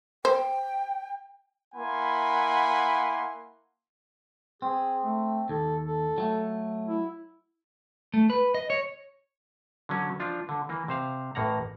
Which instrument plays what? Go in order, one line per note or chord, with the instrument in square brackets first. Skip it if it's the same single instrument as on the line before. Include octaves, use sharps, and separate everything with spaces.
[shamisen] C5 [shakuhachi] G5
[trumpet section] A#3 E4 F#5 G#5 B5 C6
[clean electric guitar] C4 [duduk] G#4
[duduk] A3
[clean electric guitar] D#2 [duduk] A4
[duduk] A4
[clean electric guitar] F#3 A3
[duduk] E4
[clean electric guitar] A3
B4
D#5
C#5
[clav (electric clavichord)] D3 F#3 C#4
F3 D4 F4
D3
E3 A#3
C3 C5 F5
A1 A2 A#3 F#5 A#5